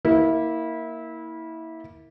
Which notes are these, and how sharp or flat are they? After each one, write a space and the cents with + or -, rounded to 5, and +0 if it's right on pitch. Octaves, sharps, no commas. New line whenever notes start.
A#3 +0 E4 -25